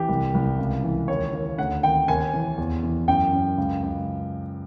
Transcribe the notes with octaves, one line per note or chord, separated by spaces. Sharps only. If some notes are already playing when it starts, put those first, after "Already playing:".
Already playing: E3 G4
C2
C2
C#2
E3
D#2 C#5
D#2
D2 F#5
D#3 G5
D#2 G#5
E3
E2
E3
F#2 G5
F#2
C#2
C#2